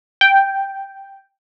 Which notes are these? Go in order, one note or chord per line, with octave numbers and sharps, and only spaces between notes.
G5